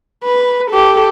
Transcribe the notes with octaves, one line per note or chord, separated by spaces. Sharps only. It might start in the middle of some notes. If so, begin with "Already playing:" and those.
B4
G4 A4